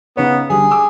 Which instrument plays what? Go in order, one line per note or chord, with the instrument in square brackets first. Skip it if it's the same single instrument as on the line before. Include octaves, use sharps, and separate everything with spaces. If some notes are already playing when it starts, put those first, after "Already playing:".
[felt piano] C#3 D#4 C#5 [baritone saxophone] B3
[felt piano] D3 G3 [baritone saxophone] G#4
[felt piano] D6 E6